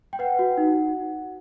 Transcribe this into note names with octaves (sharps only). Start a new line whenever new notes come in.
G5
B4 F#5
F#4
D#4